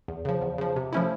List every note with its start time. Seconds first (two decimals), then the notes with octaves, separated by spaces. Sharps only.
0.08 E2
0.25 C#3 F3
0.42 E2
0.58 C#3 F3
0.76 C3
0.93 F3 A3 C#4 E4